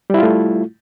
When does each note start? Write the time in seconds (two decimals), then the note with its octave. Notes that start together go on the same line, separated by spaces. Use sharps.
0.10 G3
0.14 E4
0.18 F4
0.23 A3